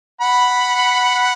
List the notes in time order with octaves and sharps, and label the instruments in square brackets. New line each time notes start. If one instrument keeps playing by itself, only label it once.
[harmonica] F#5 B5